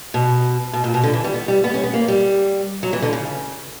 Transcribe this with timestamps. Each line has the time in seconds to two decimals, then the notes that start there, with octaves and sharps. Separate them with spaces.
0.14 B2
0.73 B2
0.84 A#2
0.94 B2
1.03 D3
1.14 E3
1.24 G3
1.34 B3
1.48 G3
1.64 B3
1.74 C#4
1.83 B3
1.94 A#3
2.08 G3
2.83 F#3
2.93 E3
3.02 D3
3.13 C#3